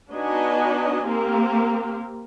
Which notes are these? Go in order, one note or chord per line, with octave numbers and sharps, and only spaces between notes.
B3 D4 D#4 F#4 D#5 G#5
A#3 C4 G4 A#4